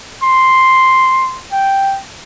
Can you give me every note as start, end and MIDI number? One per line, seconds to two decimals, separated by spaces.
0.23 1.39 84
1.52 1.98 79